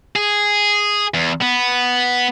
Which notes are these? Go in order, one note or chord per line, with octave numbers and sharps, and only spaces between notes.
G#4
E2
B3